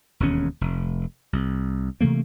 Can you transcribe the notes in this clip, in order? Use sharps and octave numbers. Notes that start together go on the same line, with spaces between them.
E1 D#2 C#4
F1
C2
C3 E3 A3 A#3